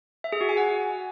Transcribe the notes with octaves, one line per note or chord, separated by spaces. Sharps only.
E5
G#4
F#4
G#5
F#5